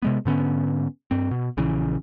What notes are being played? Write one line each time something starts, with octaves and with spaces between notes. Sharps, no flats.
C3 G#3 B3
G#2 D3 B3 C#4
G2 C4
B2
A#1 C#3 E3